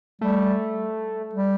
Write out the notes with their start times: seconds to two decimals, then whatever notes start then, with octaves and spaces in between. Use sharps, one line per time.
0.21 G3 A3
1.33 G3